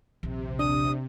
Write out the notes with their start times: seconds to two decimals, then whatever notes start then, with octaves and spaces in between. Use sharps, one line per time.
0.23 A#1 D#2 C3
0.59 D4 D#6